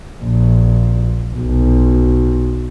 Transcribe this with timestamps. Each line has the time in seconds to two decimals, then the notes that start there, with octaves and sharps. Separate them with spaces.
0.22 A#1
1.35 B1